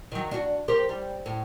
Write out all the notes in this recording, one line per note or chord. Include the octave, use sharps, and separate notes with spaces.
D#3 F#3
D4 F#4
G4 A#4 C5
G3
A2